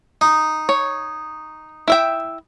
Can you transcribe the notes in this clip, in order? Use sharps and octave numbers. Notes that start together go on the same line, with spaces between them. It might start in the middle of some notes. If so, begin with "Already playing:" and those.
D#4
C#5
E4 E5 G5